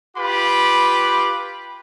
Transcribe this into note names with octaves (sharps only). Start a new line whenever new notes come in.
F4 G4 B4 B5 D6